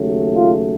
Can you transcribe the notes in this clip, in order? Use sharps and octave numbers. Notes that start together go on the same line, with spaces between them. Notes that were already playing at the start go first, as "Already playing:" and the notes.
Already playing: D#2 C#3 F#3 A3
F4